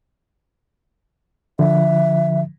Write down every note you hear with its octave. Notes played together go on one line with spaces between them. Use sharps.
D3 F3 E5